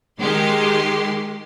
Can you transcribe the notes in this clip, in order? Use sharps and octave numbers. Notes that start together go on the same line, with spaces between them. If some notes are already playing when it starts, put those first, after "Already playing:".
D#3 G#3 G4 C6